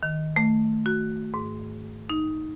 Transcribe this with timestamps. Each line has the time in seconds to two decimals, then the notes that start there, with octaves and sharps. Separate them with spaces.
0.03 D#3
0.36 A3
0.86 F#4
1.34 G#2
2.10 D#4